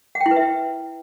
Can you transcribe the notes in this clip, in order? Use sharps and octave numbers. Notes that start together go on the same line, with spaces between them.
F#5
G5
E4
B4
E5